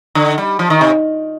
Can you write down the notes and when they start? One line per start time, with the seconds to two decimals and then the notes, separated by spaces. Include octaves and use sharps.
0.15 D3
0.38 G3
0.59 F3
0.70 D#3
0.81 C3